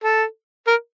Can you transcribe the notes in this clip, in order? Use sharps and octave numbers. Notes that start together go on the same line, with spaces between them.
A4
A#4